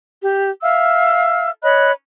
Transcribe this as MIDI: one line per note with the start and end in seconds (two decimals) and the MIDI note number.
0.23 0.49 67
0.63 1.50 76
0.63 1.50 77
0.63 1.50 88
0.63 1.50 89
1.63 1.92 73
1.63 1.92 75
1.63 1.92 83
1.63 1.92 90